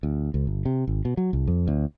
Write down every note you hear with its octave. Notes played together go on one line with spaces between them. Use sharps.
D2
C#2
G1
C3
G#1
B2
F#3
C2
F2
D2